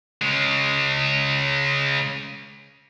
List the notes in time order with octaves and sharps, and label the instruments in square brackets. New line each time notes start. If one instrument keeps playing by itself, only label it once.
[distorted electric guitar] C#3 G#3